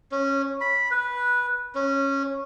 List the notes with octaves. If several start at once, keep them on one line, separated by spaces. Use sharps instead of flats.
C#4
B5
B4
C#4